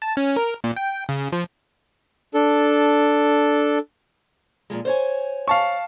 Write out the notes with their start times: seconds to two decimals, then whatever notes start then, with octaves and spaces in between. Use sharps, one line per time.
0.02 A5
0.17 C#4
0.36 A#4
0.64 A#2
0.76 G5
1.09 C#3
1.32 F3
2.34 D4 A4
4.70 A#2 F3 G#3
4.85 C5 C#5 G#5
5.48 F5 A5 C#6